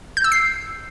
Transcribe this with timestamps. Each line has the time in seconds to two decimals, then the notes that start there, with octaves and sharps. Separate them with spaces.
0.17 G6
0.24 E6
0.32 C7